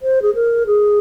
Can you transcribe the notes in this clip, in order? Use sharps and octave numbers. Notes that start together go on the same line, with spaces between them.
C5
G#4
A#4
G#4